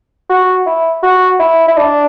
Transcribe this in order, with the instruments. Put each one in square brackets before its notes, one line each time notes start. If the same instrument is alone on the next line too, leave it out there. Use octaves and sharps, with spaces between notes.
[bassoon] F#4
E4
F#4
E4
E4
D4